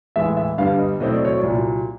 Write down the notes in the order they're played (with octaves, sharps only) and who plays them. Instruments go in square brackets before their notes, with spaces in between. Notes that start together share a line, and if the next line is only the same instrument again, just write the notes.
[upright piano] A2 E3 G#3 B3 [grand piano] E5
[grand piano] E5
[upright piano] G2 D3 G3 B3 D4 [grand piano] F5
[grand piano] D#5
[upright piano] B2 F#3 A3 C4 E4 [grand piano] D#5
[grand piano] D5
C#5
D5
[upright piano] C2 A#2 F#3